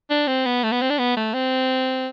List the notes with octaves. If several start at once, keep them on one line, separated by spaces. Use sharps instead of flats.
D4
C4
B3
A3
B3
C4
D4
B3
A3
C4